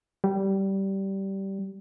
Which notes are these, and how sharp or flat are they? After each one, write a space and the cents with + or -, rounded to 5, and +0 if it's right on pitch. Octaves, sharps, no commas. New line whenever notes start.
G3 -15